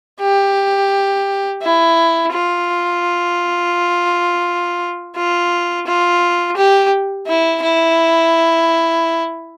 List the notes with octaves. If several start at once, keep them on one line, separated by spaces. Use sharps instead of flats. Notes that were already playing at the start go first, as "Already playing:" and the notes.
G4
E4
F4
F4
F4
G4
E4
E4